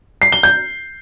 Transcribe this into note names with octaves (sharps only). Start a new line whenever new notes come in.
C7
G7
G6